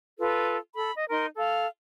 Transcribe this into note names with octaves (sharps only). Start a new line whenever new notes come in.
F4 A4 B4
A4 B5
D#5
D#4 A#4 C6
A4 F5